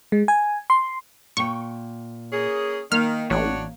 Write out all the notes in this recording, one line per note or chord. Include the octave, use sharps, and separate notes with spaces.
G#3
G#5
C6
A#2 G5 C#6
A#3 C#4 G#4
D#3 A#3 F6
A1 D4 F#4 C#5